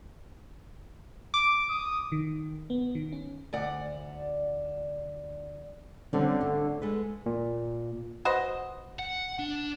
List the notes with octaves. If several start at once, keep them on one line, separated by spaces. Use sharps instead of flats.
D6
D#6
D#3
B3
D#3
C#4
D2 D5 F#5
D3 G3 C4 C#4
A2
G#3 A4 B4
A#2
F#4 B4 C5 D#5
F#5
D4